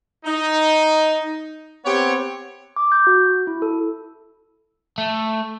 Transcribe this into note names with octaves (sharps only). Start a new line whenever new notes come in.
D#4
B3 C4 G4 C#5
D6
G6
F#4
E4
A4
A3